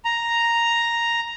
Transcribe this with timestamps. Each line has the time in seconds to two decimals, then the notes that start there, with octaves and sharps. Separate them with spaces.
0.05 A#5